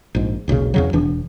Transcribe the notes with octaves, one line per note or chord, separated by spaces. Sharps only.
A#1 G#2
E1 B1 A#2 C#3
E2 C#3 F#3
E1 E3 D4